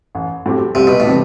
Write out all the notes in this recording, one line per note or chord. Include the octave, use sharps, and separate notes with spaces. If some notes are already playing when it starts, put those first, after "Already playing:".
A1
A2 F#3 C4 G4
C2 C3
B2
A2
C3 E3 G3 C4